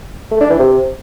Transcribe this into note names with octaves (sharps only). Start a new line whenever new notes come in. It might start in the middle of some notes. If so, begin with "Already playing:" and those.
A3
D4
E3
C3